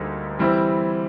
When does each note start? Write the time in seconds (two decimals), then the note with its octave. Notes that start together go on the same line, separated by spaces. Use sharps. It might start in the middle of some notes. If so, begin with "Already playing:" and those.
Already playing: D2 D3 G3 A#3 D#4
0.39 E3 G3 C4 E4